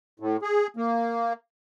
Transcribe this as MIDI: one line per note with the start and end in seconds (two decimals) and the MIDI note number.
0.20 0.37 45
0.42 0.67 68
0.77 1.33 58